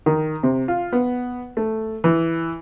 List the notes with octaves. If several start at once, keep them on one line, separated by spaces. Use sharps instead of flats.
D#3
C3
F4
B3
A3
E3